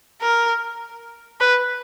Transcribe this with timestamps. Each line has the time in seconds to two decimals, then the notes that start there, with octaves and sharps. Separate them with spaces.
0.22 A#4
1.40 B4